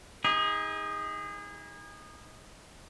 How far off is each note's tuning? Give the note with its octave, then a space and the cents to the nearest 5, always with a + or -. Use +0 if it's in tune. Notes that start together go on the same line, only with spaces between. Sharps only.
D#4 +30 G#4 -25